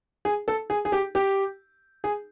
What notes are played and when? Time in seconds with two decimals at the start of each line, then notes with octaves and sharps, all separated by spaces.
0.25 G#4
0.48 A4
0.70 G#4
0.85 G#4
0.92 G4
1.15 G4
2.04 G#4